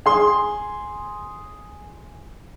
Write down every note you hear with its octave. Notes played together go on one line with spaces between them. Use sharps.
G#4 C6